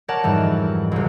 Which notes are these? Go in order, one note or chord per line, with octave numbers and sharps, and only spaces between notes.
A#4 C#5 D5 F#5 A5
F2 G#2 E3 G3
F#1 C2